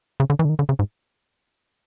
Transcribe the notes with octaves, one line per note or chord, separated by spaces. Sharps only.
C#3
D3
E3
D3
D#3
D3
C#3
G#2